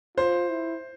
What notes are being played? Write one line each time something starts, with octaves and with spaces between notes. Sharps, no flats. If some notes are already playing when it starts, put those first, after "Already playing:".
F4 C5
E4